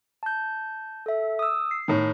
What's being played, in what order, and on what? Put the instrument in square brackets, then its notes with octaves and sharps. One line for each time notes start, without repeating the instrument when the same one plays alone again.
[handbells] A5 G6
A4 E5
D#6 E6
C7
[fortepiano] A2 D#3